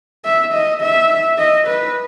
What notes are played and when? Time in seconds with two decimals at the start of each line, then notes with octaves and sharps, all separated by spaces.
0.25 E5
0.53 D#5
0.82 E5
1.39 D#5
1.68 B4